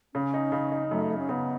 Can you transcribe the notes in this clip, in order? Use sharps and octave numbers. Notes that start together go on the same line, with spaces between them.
C#3 C#4
D#4
C#3
D#4
F#2 A3
F#2
C#4
C#3 B3